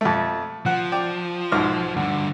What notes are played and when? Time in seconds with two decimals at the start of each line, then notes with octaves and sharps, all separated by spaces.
0.01 F2 A3
0.66 F3 F#5
0.92 D5 G5
1.52 B1 G#2 F6
1.96 D2 G2 D3